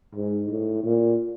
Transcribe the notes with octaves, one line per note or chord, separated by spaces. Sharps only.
G#2
A2
A#2